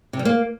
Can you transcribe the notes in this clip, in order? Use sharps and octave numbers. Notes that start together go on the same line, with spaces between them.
C3
G3
A#3